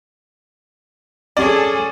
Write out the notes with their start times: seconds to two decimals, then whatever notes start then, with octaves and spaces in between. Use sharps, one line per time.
1.37 C#4 G#4 A4 D5